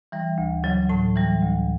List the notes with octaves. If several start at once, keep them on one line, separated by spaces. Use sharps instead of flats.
E3 G3
D2
C#3 F#3
A2 A5
E3 G3
D2